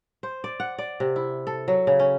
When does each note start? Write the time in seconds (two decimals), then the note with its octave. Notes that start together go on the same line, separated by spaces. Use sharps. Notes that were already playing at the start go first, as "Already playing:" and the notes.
0.23 C5
0.44 D5
0.60 F#5
0.78 D5
1.00 C3
1.16 E4
1.47 A4
1.68 F#3
1.87 C#3
1.99 C#4